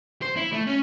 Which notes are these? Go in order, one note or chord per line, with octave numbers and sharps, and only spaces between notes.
C5
E4
A3
C#4